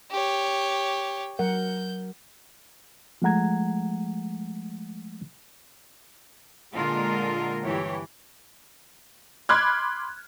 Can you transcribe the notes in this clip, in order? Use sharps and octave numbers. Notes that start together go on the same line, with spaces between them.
G4 C#5
F#3 A#4 F#5 G6
F3 G#3 A3 F#5 A#5 G#6
A#2 D3 G#3 F4 A#4
G2 E3 G4 C#5
B5 C6 D6 F6 F#6 G#6